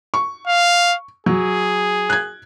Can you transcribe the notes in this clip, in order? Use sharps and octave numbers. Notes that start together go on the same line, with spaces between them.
C#6
F5
F#3 G#4
F#6 G#6